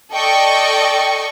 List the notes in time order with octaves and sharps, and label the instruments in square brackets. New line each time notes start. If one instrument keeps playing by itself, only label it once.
[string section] A4 D5 D#5 G5 C#6